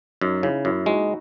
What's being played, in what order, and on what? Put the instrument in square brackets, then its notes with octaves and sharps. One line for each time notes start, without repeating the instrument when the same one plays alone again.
[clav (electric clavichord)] F#2 [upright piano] D#4
[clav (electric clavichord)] C#3 [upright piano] E4
[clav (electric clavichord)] F#2 [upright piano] E4
[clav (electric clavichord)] G#3 [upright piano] D#4 F#4